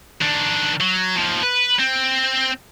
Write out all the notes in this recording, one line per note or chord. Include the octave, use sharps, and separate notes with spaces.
D#3 D4
F#3
D#2 F3
B4
C4